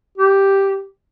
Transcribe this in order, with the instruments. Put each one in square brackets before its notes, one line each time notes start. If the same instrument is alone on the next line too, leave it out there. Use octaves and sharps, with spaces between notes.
[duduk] G4